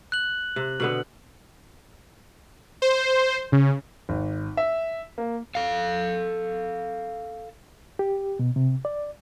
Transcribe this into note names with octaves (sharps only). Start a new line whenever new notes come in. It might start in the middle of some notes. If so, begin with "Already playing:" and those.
F#6 F#7
C3
B2 D3 B3 F#7
C5
C#3
G#1
E5
A#3
A4 F5
G4
B2
C3
D5